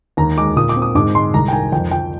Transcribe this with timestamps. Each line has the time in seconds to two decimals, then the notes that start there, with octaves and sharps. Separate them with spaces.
0.17 D#2 A#5
0.37 G#3 D6
0.56 A#2 D#6
0.69 D6
0.76 C4
0.82 D#6
0.95 G#2 D6
1.15 G#3 C6
1.34 C2 A#5
1.48 G5
1.53 D#3 G#5
1.72 F2 G5
1.91 F3 G5